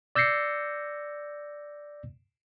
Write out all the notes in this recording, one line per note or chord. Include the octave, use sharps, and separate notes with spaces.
D5 E6 G6 A#6 C7 C#7